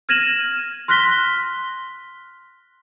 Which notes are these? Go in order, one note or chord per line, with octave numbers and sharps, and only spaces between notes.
F6 G#6 A#6 D#7 E7 F#7
C6 F6 F#6 A#6 B6 G7